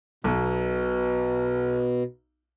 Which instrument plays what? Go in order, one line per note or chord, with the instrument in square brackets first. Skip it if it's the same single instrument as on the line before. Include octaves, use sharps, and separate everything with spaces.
[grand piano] B1 [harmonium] B2